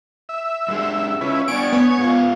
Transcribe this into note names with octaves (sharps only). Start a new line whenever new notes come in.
E5
F#2 G#3
C#2 C#4 E4 B4
B3 D4 G#5 C#6 D7
B3 C#5
G#2 F4